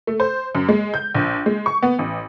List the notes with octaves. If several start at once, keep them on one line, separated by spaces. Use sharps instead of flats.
A3
C5
F#2
G#3
G6
A#1
G#3
C#6
B3
A1